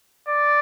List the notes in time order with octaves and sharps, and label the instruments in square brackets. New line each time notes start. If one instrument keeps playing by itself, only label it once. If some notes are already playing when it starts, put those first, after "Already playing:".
[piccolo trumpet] D5